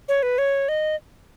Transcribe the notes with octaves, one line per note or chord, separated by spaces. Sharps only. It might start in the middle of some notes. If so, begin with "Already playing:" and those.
C#5
B4
C#5
D#5